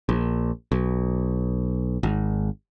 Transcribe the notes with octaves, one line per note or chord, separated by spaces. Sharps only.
A#1
B1
G#1